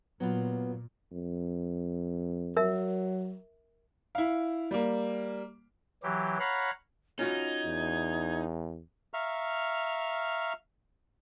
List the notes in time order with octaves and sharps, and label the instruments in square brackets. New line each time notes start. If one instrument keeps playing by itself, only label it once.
[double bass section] A#2 [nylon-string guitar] F#3 F4 [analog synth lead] B3
[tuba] F2
[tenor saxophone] F#3 [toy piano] A#4 E5
[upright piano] E4 F5
G3 A#3
[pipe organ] E3 F#3 G4
C#5 F5 F#5 A#5 B5
[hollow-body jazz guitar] C#4 F4 F#4 [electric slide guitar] D#4 [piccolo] G#6
[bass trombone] E2
[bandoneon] E5 F5 A#5 C#6 F6